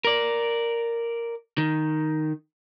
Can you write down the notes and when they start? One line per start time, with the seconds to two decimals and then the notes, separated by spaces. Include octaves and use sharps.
0.05 A#4 D5
1.58 D#3